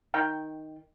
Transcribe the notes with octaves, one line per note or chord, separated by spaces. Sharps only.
D#3 G5